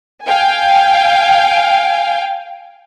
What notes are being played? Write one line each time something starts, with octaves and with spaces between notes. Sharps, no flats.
F5 G5 G#5